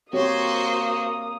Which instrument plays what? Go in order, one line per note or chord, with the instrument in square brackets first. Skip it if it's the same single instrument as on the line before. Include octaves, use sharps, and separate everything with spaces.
[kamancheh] A#3 D#6 [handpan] C4 G4 C#5 [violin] F#4 C5